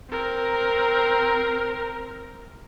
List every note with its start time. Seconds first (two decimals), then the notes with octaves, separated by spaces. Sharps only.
0.11 C4 A#4